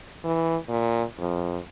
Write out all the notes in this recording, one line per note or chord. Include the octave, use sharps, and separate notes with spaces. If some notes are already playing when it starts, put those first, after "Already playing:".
E3
A#2
F2